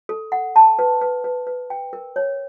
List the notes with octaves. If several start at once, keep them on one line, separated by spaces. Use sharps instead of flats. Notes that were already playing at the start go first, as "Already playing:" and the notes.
A4
F#5
A5
B4
B4
B4
B4
G5
A#4
C#5